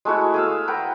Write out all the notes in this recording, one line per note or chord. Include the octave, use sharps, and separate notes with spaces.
G#3 A3 E4 F#4
G#4 F5 E6
B4 F#5 G5 A#5